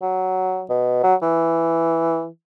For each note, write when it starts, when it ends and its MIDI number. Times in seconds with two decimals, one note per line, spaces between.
0.02 0.64 54
0.70 1.03 47
1.03 1.15 54
1.22 2.27 52